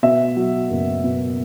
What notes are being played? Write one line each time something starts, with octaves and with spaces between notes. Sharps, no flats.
B2 E5
F#3
F#1
B2